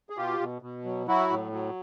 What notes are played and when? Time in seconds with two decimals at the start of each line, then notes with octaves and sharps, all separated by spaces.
0.10 G#4
0.17 B2 F4 G4
0.40 B2
0.62 B2
0.84 F#3
1.07 F#3 E4 F#4
1.30 A2
1.53 F#3